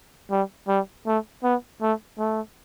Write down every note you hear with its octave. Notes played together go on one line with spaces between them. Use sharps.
G3
G3
A3
B3
A3
A3